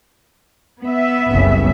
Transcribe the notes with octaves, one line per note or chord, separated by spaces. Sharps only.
B3 E5
F#1 C2 C#3